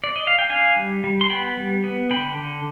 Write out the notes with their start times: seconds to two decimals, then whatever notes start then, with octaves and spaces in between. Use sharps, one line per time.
0.04 D5
0.16 D#5
0.27 F5
0.38 G5
0.50 D4 F5 G#5
0.77 G3
1.04 G3
1.21 C6
1.30 B3 G5 B5
1.57 G3
1.84 B3
2.11 D3 G5 B5
2.37 D3